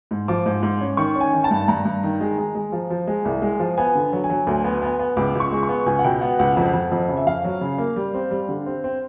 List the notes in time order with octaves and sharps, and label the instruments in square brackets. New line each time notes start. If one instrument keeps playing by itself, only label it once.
[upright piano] G#2
F3 D6
G#2
G#2
C#4
D#3 C#6
C#4
G#5
D#3
A5
G2
G2 A#5
G2
D#3
G#3
G#3
G#3
F3
F3
G#3
C2
G#3
F3
B3 G#5
D3
F#3
G#5
F#3
D2
B3
B3
B3
C#2 D6
C#2
C#6
G#3
C#6
B3
C#2 G#5
F#5
B2 G5
B3 F#5
C#2 F#5
F2 F#5
F2
F2
C#3
E5
F2 F5
F#3
C#3
A#3
G3
C4
G3
D3
C4
C4